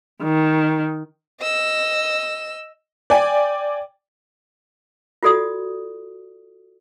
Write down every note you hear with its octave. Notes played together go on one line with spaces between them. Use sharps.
D#3
D#5 E6
D5 G5 G#5
F4 F#4 A4 D5 D#6